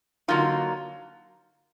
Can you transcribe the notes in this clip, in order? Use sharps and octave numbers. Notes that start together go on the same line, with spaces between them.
D3 F#3 A#3 D#4 F4